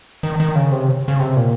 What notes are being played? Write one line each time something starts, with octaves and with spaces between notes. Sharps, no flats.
D#3
D#3
C#3
C3
C#3
C3
A#2